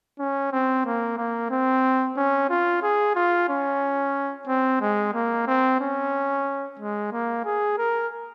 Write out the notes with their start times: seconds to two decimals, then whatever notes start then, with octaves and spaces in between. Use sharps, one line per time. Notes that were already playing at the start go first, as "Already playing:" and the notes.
0.19 C#4
0.52 C4
0.85 A#3
1.18 A#3
1.51 C4
2.17 C#4
2.50 F4
2.83 G#4
3.15 F4
3.49 C#4
4.47 C4
4.81 G#3
5.14 A#3
5.47 C4
5.80 C#4
6.79 G#3
7.12 A#3
7.45 G#4
7.78 A#4